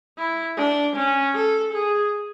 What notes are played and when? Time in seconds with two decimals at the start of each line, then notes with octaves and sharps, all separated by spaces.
0.18 E4
0.57 D4
0.96 C#4
1.35 A4
1.73 G#4